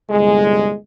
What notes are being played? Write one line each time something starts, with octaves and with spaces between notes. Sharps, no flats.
G1 C2 G#3